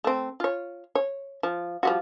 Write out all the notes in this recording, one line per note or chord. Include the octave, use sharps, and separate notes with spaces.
A3 C4
F4 C#5
C#5
F3
F3 G3 F#4